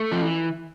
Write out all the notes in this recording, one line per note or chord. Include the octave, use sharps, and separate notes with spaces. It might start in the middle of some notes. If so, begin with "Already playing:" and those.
Already playing: A3
F3
E3